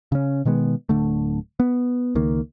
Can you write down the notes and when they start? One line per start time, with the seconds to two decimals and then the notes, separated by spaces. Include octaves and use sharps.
0.12 C#3 C#4
0.45 B2 D#3 G#3 B3
0.89 D1 D3 A3
1.60 B3
2.15 C#2 D#3 A#3